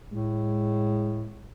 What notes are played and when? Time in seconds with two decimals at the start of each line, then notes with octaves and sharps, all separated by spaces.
0.12 A2 G#3